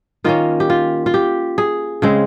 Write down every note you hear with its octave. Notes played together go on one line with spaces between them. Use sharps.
D#3 A#3 C#4 F4
G4
F4
F4
G4
G#4
C#3 G#3 C4